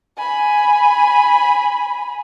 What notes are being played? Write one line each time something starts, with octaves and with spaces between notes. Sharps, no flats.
G#5 B5